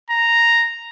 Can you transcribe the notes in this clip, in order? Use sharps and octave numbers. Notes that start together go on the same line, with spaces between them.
A#5